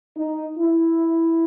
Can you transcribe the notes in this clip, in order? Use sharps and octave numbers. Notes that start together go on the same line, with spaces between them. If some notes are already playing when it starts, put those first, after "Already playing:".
D#4
E4